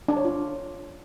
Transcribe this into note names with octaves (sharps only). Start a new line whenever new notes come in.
D4
C#5
F4